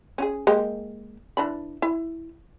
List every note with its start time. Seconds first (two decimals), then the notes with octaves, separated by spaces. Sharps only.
0.18 C#4 F#4 G#4
0.47 G#3 A#3 G4
1.37 E3 D4 B5
1.82 E4